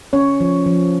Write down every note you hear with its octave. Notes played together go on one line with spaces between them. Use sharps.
C#4 C#5
F3
F3